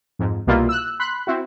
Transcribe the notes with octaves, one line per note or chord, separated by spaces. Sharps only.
F2 G#2
C2 B2 G3 A#3 E4 F4
E6 F#6
B5 C6 F#6
C4 E4 F#4